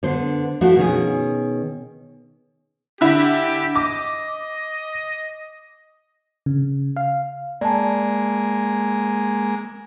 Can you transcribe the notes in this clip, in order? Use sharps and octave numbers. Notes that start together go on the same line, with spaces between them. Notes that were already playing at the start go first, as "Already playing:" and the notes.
D3 B3 C5
F3 A3 E4 F#4
B2 D#3 C#4 G#4
D3 E4 G4
D#5 D6
C#3
F5
G#3 A#3 D5 A5